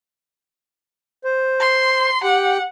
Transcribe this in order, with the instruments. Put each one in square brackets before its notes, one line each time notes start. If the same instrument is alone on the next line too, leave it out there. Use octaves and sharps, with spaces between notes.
[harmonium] C5
[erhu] C6
[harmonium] G4 G5 [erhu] F#5